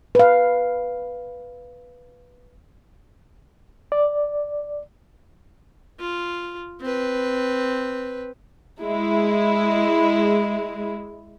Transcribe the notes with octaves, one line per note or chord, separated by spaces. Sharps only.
B4 F5
D5
F4
C4 B4
G#3 E4